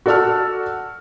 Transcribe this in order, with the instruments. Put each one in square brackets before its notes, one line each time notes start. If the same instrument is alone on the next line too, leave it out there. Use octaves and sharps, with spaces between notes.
[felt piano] F#4 A4 D5 A5 E6 F6